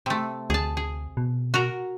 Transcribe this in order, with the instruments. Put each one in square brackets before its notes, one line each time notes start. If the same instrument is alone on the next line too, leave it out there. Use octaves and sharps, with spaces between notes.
[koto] C3 A3
[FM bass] D2 [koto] G#4 A5
[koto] G#4
[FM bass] B2
[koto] F#4 A#4 A#5